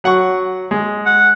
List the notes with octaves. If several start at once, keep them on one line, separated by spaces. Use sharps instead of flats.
F#3 F#5 C#6
G#3
F#5